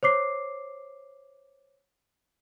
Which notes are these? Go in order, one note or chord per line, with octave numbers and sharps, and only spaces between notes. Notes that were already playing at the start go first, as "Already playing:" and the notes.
C5 C#5 D6 C7